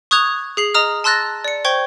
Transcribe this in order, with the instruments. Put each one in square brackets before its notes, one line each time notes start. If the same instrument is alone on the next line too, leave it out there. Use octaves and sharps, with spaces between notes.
[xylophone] C#6 D#6 F#6 G#6 F7
G#4 C7 F#7
D#5 A#5 D#6 F6
A5 C6 E6 F#6 A6 A#6
D5 C#7
C5 G5 C#6 G#6 G7